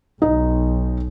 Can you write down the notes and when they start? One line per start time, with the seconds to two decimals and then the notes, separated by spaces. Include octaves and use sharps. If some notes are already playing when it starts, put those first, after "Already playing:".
0.22 B1 D#4